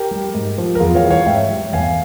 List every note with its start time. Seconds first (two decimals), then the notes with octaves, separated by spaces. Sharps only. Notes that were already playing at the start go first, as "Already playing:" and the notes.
Already playing: G4 A#4
0.11 G3
0.34 G#2
0.58 F3
0.75 A#4
0.80 E2 F4 G#4
0.95 C#5 F5
1.03 E3 G3
1.10 C#5 F5
1.26 G#2 E5 G5
1.50 G3
1.73 E2 F5 G#5